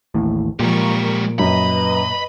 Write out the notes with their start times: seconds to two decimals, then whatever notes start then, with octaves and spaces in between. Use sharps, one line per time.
0.14 A1 D#2 A2
0.60 A#2 F3 G#3 G4 A#4 C#6
1.39 F#2 B4 D#5 B5